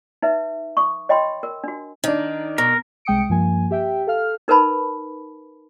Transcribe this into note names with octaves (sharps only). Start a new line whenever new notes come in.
D#4 B4 E5
C#6 D#6
C#5 D#5 G5 B5 C6
A#4
D4 F#4
D#3 D4 D#4
B2 A#4
C2 G#3 G5 D#6 C#7 D7
G2 F3 A#3 G#5
G4 E5 G5
A4 F5 F6
D#4 A#4 B4 A5 B5